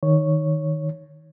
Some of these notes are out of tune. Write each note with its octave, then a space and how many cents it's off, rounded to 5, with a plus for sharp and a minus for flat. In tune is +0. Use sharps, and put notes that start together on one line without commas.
D#3 +0 C#5 +0